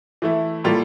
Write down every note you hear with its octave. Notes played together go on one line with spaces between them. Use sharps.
E3 A3 E4
A2 G3 A#3 F4 A4